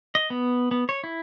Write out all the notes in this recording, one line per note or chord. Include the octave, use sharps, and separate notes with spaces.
D#5
B3
B3
C#5
E4